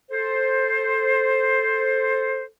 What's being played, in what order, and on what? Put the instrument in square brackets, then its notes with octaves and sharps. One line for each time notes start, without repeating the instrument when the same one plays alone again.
[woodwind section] A4 C5